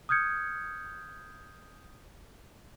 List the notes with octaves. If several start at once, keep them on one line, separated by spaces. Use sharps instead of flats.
D#6 F6 G6 G#6 C#7